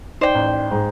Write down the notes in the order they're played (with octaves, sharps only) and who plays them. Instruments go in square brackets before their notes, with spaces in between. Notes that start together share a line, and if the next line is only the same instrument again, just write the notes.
[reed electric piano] D#4 D5 [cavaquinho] C5 G5
[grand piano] A1
[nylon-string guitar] G#2